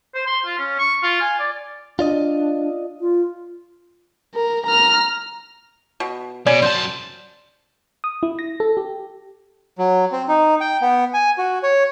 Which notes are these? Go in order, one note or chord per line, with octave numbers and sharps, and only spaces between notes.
C5
C6
F4
C#4
C#6
F4
G#5
D5
D4 F4 D5 D#5
F4
A#4
A#5 F6
B2
B2 C#4 D5
F#2 C5 A5
D#6
E4
A#6
A4
G4
F#3
C4
D#4
G5
B3
G#5
F#4
C#5